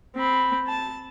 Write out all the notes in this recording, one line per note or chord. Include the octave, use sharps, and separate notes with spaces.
C4 B5
A5